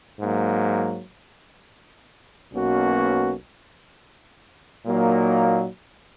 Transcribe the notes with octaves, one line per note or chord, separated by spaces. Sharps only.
G#2 F#3 A#3
B1 B2 A#3 C#4 F#4
A#2 F#3 A#3 D#4